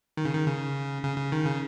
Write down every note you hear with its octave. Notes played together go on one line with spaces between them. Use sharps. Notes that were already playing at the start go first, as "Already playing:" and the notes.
D#3
C#3
D#3
C#3
C#3
C#3
D#3
C#3